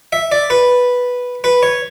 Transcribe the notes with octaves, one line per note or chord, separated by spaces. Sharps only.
E5
D5
B4
B4
C#5